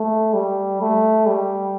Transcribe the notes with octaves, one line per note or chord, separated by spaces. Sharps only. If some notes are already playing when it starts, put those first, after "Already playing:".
Already playing: A3
G3
A3
G3